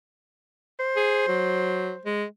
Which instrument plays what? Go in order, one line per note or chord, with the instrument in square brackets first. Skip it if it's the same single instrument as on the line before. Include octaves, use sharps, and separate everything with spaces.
[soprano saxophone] C5
[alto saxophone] G#4
F#3
G#3